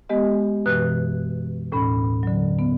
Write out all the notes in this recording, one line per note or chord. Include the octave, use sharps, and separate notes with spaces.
G#3 B3 G4 D#5
F#2 B2 E3 B4 F#6
D#2 A2 C#4 B5
D3 F#3
B3